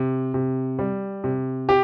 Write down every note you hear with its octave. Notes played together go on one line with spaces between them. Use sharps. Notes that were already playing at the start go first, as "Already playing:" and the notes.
Already playing: C3
C3
G3
C3
G4